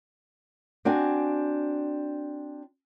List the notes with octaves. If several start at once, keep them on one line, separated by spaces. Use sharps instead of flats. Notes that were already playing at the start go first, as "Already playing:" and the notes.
C4 D4 F#4 G#5